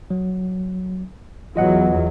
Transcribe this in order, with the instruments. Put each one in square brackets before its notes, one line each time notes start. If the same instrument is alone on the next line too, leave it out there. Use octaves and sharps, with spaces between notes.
[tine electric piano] F#3
[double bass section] E2 F#3 [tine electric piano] F4 D#5 F#5